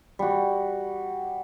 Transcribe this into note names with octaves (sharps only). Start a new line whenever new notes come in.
G3 F#4